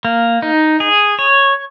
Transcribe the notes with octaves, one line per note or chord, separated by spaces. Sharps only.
A#3
D#4
G#4
C#5